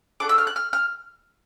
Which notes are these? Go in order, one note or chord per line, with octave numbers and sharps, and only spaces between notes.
D4 F#4 A4 D6
E6
F6
F#6
F6
F6